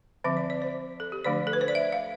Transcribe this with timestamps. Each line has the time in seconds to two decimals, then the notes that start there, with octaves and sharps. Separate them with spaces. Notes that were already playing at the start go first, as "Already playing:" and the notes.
0.24 D3 F3 C4 E5
0.37 D5
0.50 D5
0.62 C5
1.00 A4
1.12 G4
1.25 D3 F3 A3 D4 D5
1.47 A4
1.53 B4
1.61 C5
1.68 D5
1.75 E5
1.92 F5